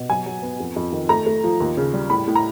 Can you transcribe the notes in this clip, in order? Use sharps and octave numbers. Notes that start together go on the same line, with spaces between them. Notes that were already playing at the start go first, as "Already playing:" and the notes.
Already playing: B2
F#3 G#5
F#3
B3
F2
F2
D#3
A3 A#5
A3
F3
D#2
C#3
G3
A2 B5
A2
A#5